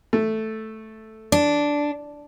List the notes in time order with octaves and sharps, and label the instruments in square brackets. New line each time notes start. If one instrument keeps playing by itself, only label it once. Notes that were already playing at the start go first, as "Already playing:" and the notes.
[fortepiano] A3
[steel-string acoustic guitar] D4